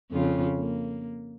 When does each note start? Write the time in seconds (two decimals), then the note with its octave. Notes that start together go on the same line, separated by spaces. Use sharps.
0.12 F2 C#3 F4
0.58 A#3